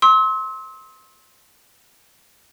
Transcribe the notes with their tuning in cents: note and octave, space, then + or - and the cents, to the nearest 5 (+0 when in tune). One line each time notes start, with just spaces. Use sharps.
C6 +20 E6 -40